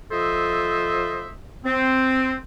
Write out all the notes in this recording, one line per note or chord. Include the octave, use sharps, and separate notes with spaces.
F3 A4 C5 D#5 E5
C4